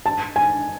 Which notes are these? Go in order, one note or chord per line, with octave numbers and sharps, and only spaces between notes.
A5
G#5